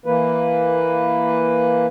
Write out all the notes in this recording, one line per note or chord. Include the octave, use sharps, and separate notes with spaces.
E3 A#3 B4